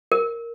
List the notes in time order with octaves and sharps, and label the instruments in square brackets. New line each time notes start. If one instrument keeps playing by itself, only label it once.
[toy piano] A#4